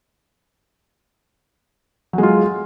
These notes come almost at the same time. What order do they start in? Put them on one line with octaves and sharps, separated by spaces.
F#3 G#3 F4